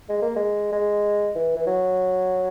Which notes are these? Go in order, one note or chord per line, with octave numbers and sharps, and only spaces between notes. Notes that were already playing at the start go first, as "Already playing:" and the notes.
G#3
A#3
G#3
G#3
E3
E3
F#3